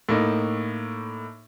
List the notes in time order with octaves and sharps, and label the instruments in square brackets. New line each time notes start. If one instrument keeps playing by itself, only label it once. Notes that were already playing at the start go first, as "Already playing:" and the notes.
[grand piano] A2 A#3 D#4